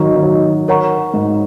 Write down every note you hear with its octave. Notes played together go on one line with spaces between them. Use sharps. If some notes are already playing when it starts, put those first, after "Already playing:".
Already playing: D#3 F#3 D#4 F#4 D#5 A#5 C#6
D#3
F#3
A#4 C#5 F#5 A#5 C#6
G#2